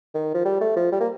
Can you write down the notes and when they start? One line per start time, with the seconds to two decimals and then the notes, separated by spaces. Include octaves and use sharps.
0.14 D#3
0.34 F3
0.45 G3
0.61 A3
0.76 F3
0.92 G3
1.00 A#3